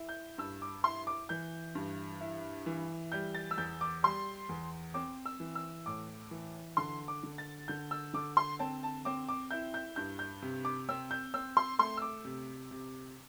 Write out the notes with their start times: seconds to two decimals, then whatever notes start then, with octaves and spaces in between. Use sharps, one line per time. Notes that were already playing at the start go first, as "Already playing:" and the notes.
Already playing: E4
0.09 G6
0.38 G2 E6
0.62 D6
0.84 E4 C6
1.07 D6
1.29 E3 G6
1.75 G2
2.21 E4
2.66 E3
3.12 G3 G6
3.35 A6
3.51 E6
3.58 E2 G6
3.81 D6
4.03 G3 C6
4.49 E2
4.94 C4 D6
5.26 E6
5.40 E3
5.55 E6
5.86 A2 D6
6.31 E3
6.77 D3 C6
7.08 D6
7.23 D3
7.38 A6
7.68 D3 G6
7.91 E6
8.14 D3 D6
8.37 C6
8.59 C4 A5
8.83 A5
9.05 C4 D6
9.29 D6
9.51 E4 G6
9.74 G6
9.96 G2 G6
10.19 G6
10.42 C3
10.65 D6
10.89 C4 E6
11.11 G6
11.34 C4 E6
11.57 C6
11.79 A3 C6
11.97 E6
12.02 D6
12.25 C3
12.71 C3